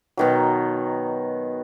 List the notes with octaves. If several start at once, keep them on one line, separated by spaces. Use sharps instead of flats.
B2 D#3 F#3